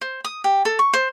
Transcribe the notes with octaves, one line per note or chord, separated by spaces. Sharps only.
C5
D#6
G4
A4
C#6
C5